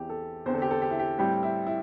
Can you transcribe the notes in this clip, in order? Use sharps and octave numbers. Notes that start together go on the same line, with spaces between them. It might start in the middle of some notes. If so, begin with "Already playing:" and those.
Already playing: E2 E3 C4 G4
A4
E2 D3 C4 C5
A4
G4
A4
G4
E4
G4
A2 G3 C4 G4
E4
E4